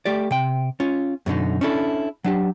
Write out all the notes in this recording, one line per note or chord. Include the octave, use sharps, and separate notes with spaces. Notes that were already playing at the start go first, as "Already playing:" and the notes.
A3 G4 D5
C3 G5
C#4 F4
F#2 B2 D3 D#4
C#4 D4 E4 F#4 A4
F#3 D4 G4